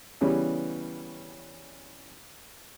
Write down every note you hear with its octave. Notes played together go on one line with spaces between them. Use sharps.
C#3 E3 G3 B3 C#4